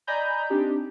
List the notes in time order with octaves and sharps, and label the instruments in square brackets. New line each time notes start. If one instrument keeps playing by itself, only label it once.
[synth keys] D5 D#5 G#5 A#5 B5 G6
C4 D4 D#4 G4